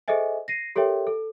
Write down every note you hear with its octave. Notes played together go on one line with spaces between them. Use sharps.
G#4 A4 C5 D#5 E5 G#5
A#6 C7 D#7
G4 A4 A#4 C#5 E5 G5
A4